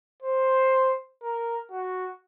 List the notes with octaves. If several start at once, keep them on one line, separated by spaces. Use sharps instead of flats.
C5
A#4
F#4